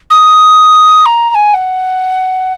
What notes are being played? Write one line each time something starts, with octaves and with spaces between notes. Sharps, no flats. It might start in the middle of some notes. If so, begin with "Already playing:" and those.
D#6
A#5
A#5
G#5
F#5